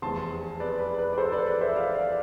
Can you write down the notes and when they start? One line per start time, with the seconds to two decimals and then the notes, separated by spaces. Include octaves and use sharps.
0.02 F1 E2 C3 A5 C6
0.60 B4 D5
0.79 B4
0.99 B4
1.13 D5
1.18 A4 C5
1.32 B4 D5
1.47 B4 D5
1.61 C5 E5
1.76 D5 F5
1.95 D5 F5